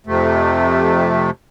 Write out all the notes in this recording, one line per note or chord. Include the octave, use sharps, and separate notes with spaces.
F2 C3 A3